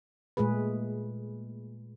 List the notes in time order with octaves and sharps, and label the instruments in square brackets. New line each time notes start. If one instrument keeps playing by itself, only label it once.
[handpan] A#2 G#3 A3 G#4 B4